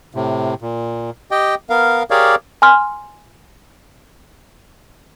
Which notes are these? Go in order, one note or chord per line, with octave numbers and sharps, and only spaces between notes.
A2 C3
A#2
G4 D#5 G5
B3 A#4 F5
G4 G#4 A#4 C#5 D5 F5
G#5 C6 F6